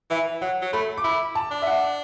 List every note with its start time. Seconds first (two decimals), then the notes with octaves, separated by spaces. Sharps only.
0.10 E3 E5
0.41 F#3 F#5
0.62 F#3
0.73 A3 B5
0.97 D6
1.04 E4 B5
1.35 A5
1.51 D4
1.62 E5
1.67 F#5